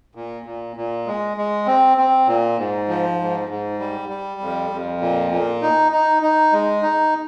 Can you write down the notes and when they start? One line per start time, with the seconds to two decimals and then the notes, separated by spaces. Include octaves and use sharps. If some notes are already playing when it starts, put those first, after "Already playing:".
0.15 A#2
0.46 A#2
0.76 A#2
1.06 G#3
1.37 G#3
1.67 C4
1.98 C4
2.27 A#2
2.58 G#2
2.88 F3
3.19 G#2
3.49 G#2
3.80 G3
4.09 G3
4.41 F2
4.71 F2
5.01 A#2
5.32 A#2
5.62 D#4
5.92 D#4
6.22 D#4
6.53 G#3
6.83 D#4